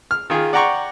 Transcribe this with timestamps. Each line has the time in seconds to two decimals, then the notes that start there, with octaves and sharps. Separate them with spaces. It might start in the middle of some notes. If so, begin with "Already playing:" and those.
0.11 F6
0.30 D#3 F4 G#4
0.53 D5 F#5 G5 A#5 C6 C#6